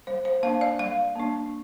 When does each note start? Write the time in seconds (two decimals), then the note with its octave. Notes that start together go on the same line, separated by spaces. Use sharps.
0.07 G3 C5
0.25 C5
0.43 A#3 D4 F5
0.61 D5
0.79 G3 F5
1.15 A#3 D4